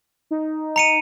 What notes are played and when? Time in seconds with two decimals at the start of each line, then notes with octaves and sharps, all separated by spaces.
0.31 D#4
0.76 A#5 C#7 D#7